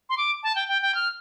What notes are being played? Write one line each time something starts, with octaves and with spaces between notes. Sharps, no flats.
C6
D6
A5
G5
G5
G5
F6